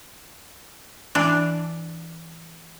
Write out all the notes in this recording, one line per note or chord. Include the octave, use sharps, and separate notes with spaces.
E3 D4